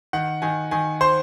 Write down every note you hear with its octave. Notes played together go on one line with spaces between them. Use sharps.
D#3 F#5
D#3 G#5
D#3 G#5
C5 C6